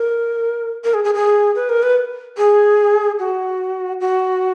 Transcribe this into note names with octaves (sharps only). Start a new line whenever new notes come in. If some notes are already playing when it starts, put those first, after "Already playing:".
Already playing: A#4
A#4
G#4
G#4
G#4
B4
A#4
B4
G#4
F#4
F#4